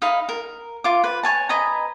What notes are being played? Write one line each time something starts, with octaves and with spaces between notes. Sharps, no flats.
D#4 D#5 F5 B5
A#4
F4 D6
B4
C#5 G#5 A5
B4 D#5 G#5 A#5